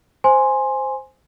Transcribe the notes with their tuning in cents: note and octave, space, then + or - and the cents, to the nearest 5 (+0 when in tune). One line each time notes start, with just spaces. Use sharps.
C5 +0 G#5 +0 C6 +5